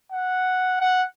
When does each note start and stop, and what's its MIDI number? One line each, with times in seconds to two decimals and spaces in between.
0.12 0.79 78
0.81 1.02 78